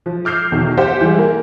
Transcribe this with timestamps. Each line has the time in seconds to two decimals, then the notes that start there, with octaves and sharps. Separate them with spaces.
0.06 F3
0.25 D6 F6 G6 C7
0.52 E2 B2 D#3
0.77 G4 C5 F#5 G6
1.01 E3 G3 G#3
1.19 A#3